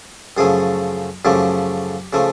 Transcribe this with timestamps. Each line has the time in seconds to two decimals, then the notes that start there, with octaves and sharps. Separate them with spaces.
0.37 F#2 C#3 F3 A3 G#4
1.25 F#2 C#3 F3 A3 G4
2.13 C#3 F3 A3